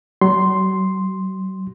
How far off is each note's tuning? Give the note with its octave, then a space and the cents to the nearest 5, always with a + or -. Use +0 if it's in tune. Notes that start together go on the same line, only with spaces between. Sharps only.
F#3 +40 C6 +0